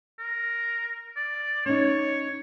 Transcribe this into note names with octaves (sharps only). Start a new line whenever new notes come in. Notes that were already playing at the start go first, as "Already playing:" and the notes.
A#4
D5
C#4 D#4 C#5